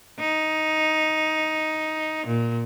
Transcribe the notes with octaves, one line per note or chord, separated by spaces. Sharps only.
D#4
A#2